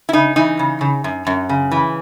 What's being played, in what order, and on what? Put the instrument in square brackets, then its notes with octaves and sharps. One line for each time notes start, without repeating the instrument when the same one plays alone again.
[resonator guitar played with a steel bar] E4
C#3 D#4
E3 D#4
C#3
C#3
F#2
F#2
C#3
E3